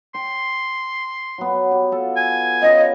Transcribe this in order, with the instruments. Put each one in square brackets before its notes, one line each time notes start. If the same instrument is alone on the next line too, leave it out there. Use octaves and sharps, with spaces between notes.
[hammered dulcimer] G5 [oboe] C6
[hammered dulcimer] F#3 B3
G4
F4 A4
[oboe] G#5
[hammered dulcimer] C#4 F4 F#5 [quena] D#5